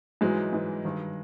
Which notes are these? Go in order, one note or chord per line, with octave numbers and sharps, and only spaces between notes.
G#2 E3 F#3 G#3
G#2 E3
G2 D#3